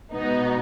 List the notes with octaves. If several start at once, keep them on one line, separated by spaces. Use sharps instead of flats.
B2 G#3 B3 D#4